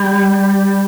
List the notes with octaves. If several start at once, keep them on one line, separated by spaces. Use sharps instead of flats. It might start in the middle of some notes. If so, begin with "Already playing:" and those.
Already playing: G3